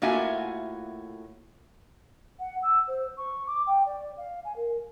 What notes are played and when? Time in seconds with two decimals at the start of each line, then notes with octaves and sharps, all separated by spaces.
0.02 A2 A#3 F4 F#4 E5 G#5
2.39 F#5
2.63 E6
2.87 C5
3.17 C#6
3.47 D6
3.67 G5
3.86 D5
4.17 F5
4.45 G#5
4.56 A#4